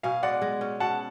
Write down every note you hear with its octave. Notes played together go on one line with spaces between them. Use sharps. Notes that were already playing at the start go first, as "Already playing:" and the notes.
B2 F5 G#5
G#3 D5 F#5
G#3
C#4
B2 F#5 A5